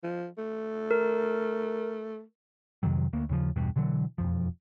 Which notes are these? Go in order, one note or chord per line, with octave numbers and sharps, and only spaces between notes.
F3
A3
A#4
F2 C3 D#3 F#3
D2 A#3
D#2 C#3 F3
B1 E2 G2 B2
B2 D3 E3 F#3
E1 A#1 F2 F3